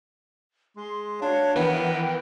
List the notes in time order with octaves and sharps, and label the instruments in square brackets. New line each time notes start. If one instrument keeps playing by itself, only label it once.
[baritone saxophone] G#3 [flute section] C6
[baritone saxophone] D4 [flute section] F#4 C#5 F5
[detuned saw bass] E3 [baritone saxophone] B3 [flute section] A#4 F#5 G5